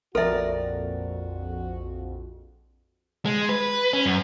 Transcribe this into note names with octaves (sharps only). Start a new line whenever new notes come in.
A#1 F2 F#4 A4 A#4 D5 E5
G#3
B4
C#4
F#2